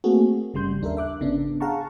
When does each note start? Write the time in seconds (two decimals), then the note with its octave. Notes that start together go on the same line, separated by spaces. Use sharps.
0.04 A3 A#3 C4 F#4 G#4 A4
0.54 G1 C#3 G3 C6 G6
0.82 D#2 D4 A4 A#4 E5
0.97 E5 D6 F#6
1.20 G#1 C#3 B3 D4
1.60 G#4 F5 F#5 A5 A#5 C#6